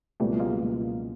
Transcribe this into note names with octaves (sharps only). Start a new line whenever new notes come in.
C#2 B2 F#3 G3 A3 B3
G#3 A#3
C#2 B2 F#3 B3